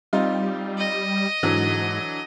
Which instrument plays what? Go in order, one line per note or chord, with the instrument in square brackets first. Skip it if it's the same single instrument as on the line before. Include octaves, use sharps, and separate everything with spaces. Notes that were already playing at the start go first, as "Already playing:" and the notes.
[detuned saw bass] G3 [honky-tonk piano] C4 D#4 F4
[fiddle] D#5
[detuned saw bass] G#2 [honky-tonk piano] D3 E3 F#3